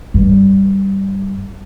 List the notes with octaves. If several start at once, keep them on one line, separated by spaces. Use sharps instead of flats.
G2